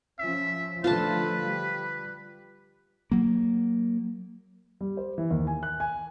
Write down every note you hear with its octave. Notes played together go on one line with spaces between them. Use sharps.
F3 C#4 E5
D3 F3 A3 F4 B4 C5 A5
G3
F#3 A#3
G3
C5
E3
D#2
G#5
F#6
G#5